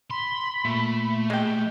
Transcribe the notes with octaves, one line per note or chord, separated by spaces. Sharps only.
B5 C6
A#2 A3
G#3 G4